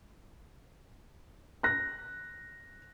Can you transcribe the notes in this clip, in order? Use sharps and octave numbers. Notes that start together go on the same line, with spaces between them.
F#6 A#6